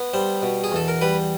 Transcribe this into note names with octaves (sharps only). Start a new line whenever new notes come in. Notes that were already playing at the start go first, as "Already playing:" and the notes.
Already playing: B3
G3 C5
B2
G#4
E2 A4
A#4
G3 B4